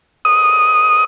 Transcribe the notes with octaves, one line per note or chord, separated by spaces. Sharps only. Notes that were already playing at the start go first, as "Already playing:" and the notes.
D#6